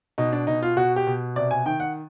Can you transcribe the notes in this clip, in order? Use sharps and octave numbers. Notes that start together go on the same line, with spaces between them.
B2 D#4
D4
B2 D#4
F4
B2 F#4
G4
B2
C3 D5
G#5
D#3 G5
F#5